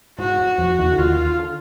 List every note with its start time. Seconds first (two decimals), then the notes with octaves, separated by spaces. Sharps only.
0.19 G#2 G#3 F#4
0.38 F#2 F#3
0.58 F2 F3
0.78 E2 E3
0.92 D3
0.98 D#2 D#3 F4
1.39 D3